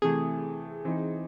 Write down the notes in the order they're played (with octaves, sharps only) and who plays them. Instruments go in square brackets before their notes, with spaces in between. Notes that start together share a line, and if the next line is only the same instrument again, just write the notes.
[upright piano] C3 E3 A3 [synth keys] G#4
[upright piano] E3 C4 D#4